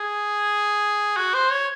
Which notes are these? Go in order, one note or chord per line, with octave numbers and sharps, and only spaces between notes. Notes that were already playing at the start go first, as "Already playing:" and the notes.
Already playing: G#4
F#4
C5
C#5